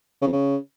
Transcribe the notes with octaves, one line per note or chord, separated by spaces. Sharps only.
C#3
F2
C#3